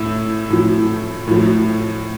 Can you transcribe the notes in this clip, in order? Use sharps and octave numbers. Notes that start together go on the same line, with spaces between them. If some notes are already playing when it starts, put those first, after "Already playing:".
Already playing: A2 E4
A2 F3
A2 F3